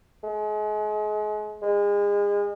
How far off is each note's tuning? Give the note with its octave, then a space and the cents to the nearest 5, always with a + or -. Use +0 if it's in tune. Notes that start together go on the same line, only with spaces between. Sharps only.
G#3 +35
G#3 -30